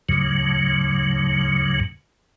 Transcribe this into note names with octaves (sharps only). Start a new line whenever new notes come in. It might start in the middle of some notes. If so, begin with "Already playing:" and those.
D2 G#2 C#3 F#3